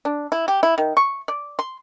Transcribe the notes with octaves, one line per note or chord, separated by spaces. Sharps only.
D4
E4
G4
E4
D#3
C#6
D5
C6